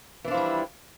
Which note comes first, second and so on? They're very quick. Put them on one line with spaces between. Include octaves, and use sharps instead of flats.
E3 D4 F3 E4 G3